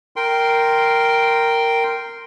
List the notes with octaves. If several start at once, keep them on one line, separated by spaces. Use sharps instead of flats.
A#4 G5 C6